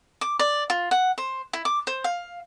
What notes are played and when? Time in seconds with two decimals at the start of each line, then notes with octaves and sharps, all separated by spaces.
0.21 D6
0.39 D5
0.70 F4
0.91 F#5
1.18 C5
1.53 E4
1.65 D6
1.87 C5
2.04 F5